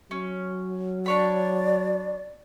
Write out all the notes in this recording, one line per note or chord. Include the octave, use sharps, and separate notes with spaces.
F#3 C#4
D4 C#5 D5 B5